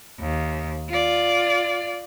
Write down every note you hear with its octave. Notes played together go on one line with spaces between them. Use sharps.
D#2
F4 D5